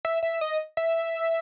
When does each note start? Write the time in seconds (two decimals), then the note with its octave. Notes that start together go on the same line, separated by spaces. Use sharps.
0.05 E5
0.23 E5
0.41 D#5
0.77 E5